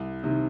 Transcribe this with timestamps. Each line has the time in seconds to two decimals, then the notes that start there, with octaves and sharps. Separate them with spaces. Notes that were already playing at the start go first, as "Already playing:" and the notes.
Already playing: C2
0.23 C3 D#3